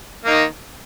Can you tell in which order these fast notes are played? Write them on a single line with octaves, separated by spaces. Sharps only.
A#3 D#4 D#3